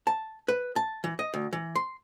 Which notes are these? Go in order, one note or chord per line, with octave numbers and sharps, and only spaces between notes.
A5
B4
A5
E3
D#5
D2
E3
C6